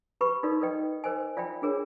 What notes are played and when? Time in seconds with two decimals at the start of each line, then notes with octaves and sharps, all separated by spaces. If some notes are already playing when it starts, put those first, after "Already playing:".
0.21 G4 B4 B5 C#6
0.43 D#4 F#4 A4 A#4 D5
0.61 A4 B4 D5 D#5 G5
1.04 A#4 C5 D#5 G#5
1.37 F4 D5 E5 G5 B5
1.62 D4 G#4 A#4 C#5